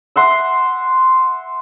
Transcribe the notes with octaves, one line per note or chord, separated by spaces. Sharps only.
E5 F#5 C6